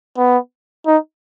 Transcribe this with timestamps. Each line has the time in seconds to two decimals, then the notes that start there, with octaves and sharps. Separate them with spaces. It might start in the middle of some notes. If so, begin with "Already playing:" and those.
0.17 B3
0.87 D#4